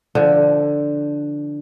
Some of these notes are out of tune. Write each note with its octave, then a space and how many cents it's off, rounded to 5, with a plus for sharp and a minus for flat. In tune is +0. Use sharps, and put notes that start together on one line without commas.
D3 +0 F3 -20